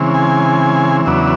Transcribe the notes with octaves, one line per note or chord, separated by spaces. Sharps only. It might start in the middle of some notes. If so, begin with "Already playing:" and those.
Already playing: C#3 E3 G#3 C4
G#5
E2 C#3 F#3 B3 D4 E5